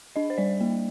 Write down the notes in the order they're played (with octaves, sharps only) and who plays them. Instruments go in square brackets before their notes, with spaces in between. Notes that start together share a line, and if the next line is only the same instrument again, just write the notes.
[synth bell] D4 D#5
C5
G3 D5
A#3